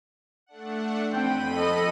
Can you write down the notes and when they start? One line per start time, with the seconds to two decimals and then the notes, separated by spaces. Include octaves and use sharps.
0.46 A3 D4 F#5
1.12 F2 C4 G5 B5 D#7
1.54 A4 D#5